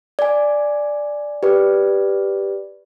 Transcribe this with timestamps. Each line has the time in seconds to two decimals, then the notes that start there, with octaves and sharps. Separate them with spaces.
0.19 D5 G#5
1.43 G4 B4 D5